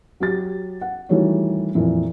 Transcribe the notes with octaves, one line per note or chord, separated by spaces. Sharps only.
F#3 G4 A6
F#5
D#3 E3 G3 A3 F#4 C#5
F2 A#2 E3